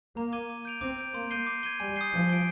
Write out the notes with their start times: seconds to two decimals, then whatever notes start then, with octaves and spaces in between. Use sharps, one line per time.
0.16 A#3 A#5
0.32 D6 G#6 D#7 G7
0.50 D6
0.65 G6 D7 F7
0.81 C4 D6
0.99 G6 D7
1.14 A#3 C6
1.30 G6 C7 D#7 G7
1.47 D6
1.63 G#6 D#7 G7
1.80 G3 G#5
1.96 D#6 G6 C7 G7
2.12 F3 G6
2.29 D7 G7